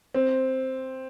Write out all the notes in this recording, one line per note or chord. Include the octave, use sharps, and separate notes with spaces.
C4